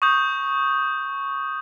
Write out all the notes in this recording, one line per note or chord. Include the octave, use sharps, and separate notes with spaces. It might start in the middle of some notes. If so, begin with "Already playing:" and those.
C#6 D#6 G6